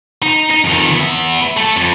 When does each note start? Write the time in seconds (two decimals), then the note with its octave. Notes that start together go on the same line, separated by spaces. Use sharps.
0.23 D#4
0.51 D#4
0.64 F2 D#3
0.96 B3 E5
1.57 A3 A4
1.76 F2